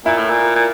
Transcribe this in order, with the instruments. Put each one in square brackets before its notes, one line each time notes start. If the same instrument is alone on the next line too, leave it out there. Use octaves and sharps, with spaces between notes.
[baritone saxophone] A#2 [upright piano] E4
[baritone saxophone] A2
A#2
A#2